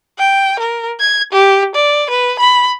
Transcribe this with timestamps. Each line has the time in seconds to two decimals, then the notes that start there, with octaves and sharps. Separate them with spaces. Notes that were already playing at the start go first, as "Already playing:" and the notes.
0.19 G5
0.60 A#4
1.00 G#6
1.33 G4
1.75 D5
2.10 B4
2.39 B5